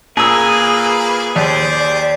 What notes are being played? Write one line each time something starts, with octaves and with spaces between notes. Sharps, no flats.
A#2 A#3 G#4 B4 D#6 E6
D#2 G4 C5 D5